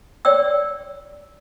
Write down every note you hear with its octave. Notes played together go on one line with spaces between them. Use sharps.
C#5 D5 G5 E6